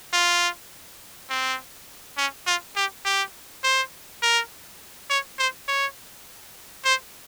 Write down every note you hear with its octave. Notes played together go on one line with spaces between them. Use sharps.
F4
C4
C#4
F4
G4
G4
C5
A#4
C#5
C5
C#5
C5